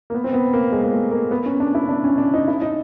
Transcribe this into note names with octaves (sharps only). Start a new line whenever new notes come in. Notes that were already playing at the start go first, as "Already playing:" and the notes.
A#3
B3
C4
B3
A#3
G#3
A#3
A3
A#3
B3
C#4
D4
E4
D4
C#4
D4
D#4
E4
D#4